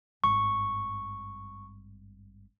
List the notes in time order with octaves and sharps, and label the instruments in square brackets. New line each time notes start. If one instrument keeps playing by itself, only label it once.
[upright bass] G#1 G2 [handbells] C#6